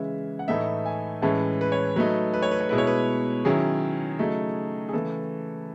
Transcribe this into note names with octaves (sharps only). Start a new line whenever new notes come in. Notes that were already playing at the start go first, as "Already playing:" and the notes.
Already playing: C#3 E3 G#3 C#4 E5
F#5
A2 E3 A3 D#4 E5
G#5
A2 E3 G#3 C#4 A5
B4
C#5
F#3 A3 D#4 B4
B4
C#5
B4
C#5
B2 G#3 B3 E4 B4
C#5
B4
D#3 F#3 C#4 E4 G#4
C#3 F#3 A3 D#4
G#4
C#3 E3 A3 A4